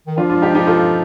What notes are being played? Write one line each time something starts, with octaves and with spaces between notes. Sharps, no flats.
D#3
F3 D4 F4
D4 F4
D#4 G4
D#4 G4
F4 A4